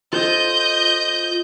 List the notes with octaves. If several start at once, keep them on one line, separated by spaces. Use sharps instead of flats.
F4 A4 C5 D#5 G6